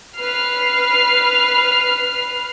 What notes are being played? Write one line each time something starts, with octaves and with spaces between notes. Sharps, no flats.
B4 F6 C7